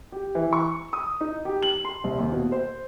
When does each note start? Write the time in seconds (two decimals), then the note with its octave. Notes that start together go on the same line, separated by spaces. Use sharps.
0.12 G4
0.35 E3
0.53 C#6
0.93 D#6
1.21 D#4
1.45 G4
1.62 F#7
1.85 C6
2.04 C2
2.19 D#2
2.32 B2
2.52 C5